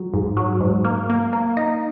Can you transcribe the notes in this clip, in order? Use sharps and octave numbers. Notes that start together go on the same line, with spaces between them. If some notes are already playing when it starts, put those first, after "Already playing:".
Already playing: F#3
G#2
F#3
G#2
A#3
A#3
A#3
D#4